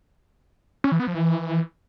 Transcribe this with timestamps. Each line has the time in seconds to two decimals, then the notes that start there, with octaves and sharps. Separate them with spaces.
0.84 C#4
0.92 E3
0.99 B3
1.07 F3
1.15 E3